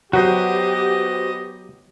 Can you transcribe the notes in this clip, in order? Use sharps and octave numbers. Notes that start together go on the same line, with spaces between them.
F#3 B3 F#4 G4 B4 C5 D#5